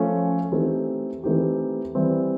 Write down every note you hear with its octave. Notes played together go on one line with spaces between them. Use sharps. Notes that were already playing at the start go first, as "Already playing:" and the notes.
Already playing: F3 A3 C#4
E3 A3 C4 D#4 G4
E3 A3 C4 D#4 G4
E3 G3 C4 E4